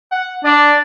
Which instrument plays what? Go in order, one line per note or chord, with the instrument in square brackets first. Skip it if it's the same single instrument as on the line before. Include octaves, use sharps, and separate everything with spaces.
[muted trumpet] F#5
[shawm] D4 [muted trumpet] D5